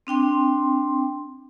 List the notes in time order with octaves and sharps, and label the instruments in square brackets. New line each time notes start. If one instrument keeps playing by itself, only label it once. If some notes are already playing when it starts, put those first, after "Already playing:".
[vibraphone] C4 D4 G5 C6